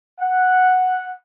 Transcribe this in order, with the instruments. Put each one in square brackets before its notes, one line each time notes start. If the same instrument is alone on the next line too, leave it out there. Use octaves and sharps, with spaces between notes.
[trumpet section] F#5